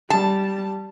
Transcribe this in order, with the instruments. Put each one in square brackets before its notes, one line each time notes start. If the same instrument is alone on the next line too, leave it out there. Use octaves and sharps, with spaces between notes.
[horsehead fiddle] G3 [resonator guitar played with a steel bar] A5